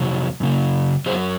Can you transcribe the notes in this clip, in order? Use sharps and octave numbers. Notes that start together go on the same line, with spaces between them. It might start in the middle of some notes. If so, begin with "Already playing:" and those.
Already playing: F2 C3 F#3
F#2 C#3 F#3
F#2 C#3 F#3 G#4 C5